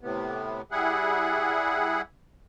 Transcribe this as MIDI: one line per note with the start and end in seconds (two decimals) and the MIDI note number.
0.01 0.62 45
0.01 0.62 48
0.01 0.62 59
0.71 2.02 55
0.71 2.02 64
0.71 2.02 68
0.71 2.02 78